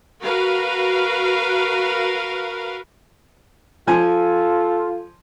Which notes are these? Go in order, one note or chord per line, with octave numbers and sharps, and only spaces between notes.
F#4 A#4 B4 F5
F3 F4 A4 G#5